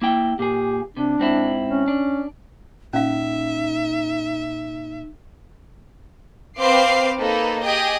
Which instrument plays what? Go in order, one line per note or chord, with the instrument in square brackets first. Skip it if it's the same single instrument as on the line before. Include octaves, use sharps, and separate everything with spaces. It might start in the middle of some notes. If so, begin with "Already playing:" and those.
[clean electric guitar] A#3 E4 G5
[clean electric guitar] A#2 G#4 [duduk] G4
[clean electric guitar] C3 [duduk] D4
[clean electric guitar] G#2 C4 E4
[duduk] C#4
[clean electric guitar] D4
[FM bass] A#2 [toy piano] C#4 F5 [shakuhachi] D#4 [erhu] E5
[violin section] C4 B4 C5 F5 D6 C7
A#3 D#4 A4 B4
G4 G#4 D#5 G5